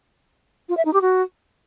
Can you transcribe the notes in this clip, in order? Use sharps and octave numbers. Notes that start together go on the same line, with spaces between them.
F4
E5
D#4
G4
F#4